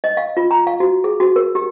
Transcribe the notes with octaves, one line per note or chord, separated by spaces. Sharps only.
D#5
F5
F4
A#5
F5
F#4
G#4
F#4
A#4
G4